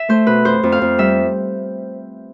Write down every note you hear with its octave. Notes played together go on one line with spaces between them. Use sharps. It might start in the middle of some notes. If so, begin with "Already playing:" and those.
Already playing: E5
A3 C5
B2 B4
F2 C5
F2
F5
F2
G3 E5